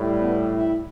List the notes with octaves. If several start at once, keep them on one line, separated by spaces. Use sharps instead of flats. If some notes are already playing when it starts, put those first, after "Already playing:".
Already playing: A2 G3
B3
E4